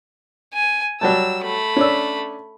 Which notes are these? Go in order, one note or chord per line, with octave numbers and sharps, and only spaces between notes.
G#5
F#3 G3 A5 E6
A3 B5
C#4 D4 E6